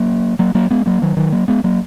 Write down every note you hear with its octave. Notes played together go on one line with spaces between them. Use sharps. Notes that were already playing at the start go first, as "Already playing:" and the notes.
Already playing: F#3 A#3
F#3 A#3
F#3 A#3
G#3 B3
F#3 A#3
D#3 F#3
D#3 F#3
F#3 A#3
G#3 B3
F#3 A#3